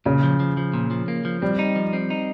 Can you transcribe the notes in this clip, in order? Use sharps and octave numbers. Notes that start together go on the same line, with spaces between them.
A#2 C#3 C#4
F3
F3
F3
A#2
F3
A#3
F3
G3 C4
D#4
F3
C4
D#4